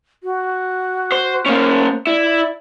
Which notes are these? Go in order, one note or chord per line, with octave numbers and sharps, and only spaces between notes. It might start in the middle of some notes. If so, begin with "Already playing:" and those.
F#4
C5
A#3 C#4 C5
E4 D5